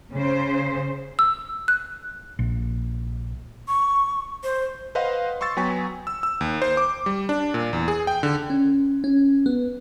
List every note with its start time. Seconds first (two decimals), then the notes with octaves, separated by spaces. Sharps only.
0.15 C#3 C5
1.19 E6
1.68 F#6
2.39 A#1
3.68 C#6
4.43 C5
4.95 B4 C5 D#5 F5 F#5 C6
5.41 C6 C#6 E6 A6
5.57 F#3 B3 G5 G#5 C#6 B6
6.07 E6
6.23 E6
6.41 D#2
6.62 C5
6.77 D6
7.06 G3
7.29 D4
7.54 A#2
7.73 E2
7.88 G#4
8.07 G5
8.23 D3
8.50 C#4
9.04 C#4
9.46 B3